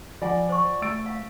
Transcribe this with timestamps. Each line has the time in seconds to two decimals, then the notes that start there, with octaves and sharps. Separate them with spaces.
0.22 F3 F4 D5 F#5 G#5
0.49 C5 C#6
0.82 A3 E6 A6 D7
1.06 F5